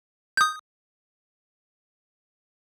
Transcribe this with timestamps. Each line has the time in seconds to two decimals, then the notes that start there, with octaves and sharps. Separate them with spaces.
0.37 D#6 G6